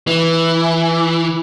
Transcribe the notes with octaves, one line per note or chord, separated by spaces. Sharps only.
E3